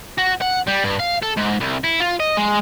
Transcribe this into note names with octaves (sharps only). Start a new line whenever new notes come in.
F#4
F#5
G3
G2
F5
A4
G#2
C2
E4
F4
D#5
G#3